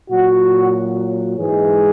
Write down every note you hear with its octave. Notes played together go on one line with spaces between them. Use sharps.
A#2 F#3 F#4
G#2 E3 G#3 G#4